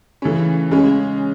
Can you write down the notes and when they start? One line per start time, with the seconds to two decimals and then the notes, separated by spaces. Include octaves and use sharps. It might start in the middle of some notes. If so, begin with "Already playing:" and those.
0.22 C#3 E3 A3 C#4
0.71 C#3 G#3 C#4